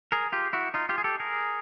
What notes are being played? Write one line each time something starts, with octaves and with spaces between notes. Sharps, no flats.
G#4 A#4
F4 G4
E4 F#4
D#4 F4
F4 G4
G#4
G4 A4
G#4 A#4